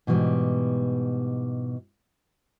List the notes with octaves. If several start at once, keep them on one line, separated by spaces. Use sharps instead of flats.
G#2 B2 E3 G3